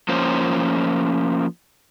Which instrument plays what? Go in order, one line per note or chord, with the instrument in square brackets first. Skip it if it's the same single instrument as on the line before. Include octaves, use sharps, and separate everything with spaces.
[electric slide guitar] F3 A#3 C#4 F4 C5